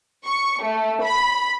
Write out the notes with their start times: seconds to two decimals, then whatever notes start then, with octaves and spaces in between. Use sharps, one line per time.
0.24 C#6
0.62 A3
1.02 B5